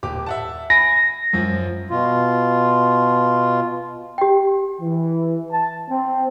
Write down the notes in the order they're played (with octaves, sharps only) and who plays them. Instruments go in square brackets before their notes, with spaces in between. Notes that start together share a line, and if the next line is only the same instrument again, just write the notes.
[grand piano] D#1 G4 D6
E5 F#5 A5
[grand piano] G#5 B5 D7 [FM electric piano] A#6
[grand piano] F#2 F3
[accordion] B2 F4
[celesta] G4 G5
[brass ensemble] E3
A5
C4